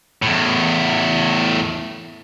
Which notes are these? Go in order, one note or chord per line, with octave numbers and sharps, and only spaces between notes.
E2 A2